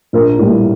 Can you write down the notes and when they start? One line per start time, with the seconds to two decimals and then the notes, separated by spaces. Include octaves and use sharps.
0.13 A#1 A#4
0.39 A2 G3 A#3